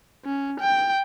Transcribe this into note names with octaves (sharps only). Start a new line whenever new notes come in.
C#4
G5